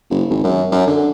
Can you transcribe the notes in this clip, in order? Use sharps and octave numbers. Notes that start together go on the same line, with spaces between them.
F#1
G#1
F#2
F#2
D3